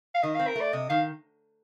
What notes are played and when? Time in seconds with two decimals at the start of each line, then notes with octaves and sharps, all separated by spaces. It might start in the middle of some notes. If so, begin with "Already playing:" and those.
0.15 F5
0.23 D#3 D#5
0.35 C4 F5
0.48 A#4
0.56 A3
0.61 D5
0.73 C3 D#5
0.90 D#3 F5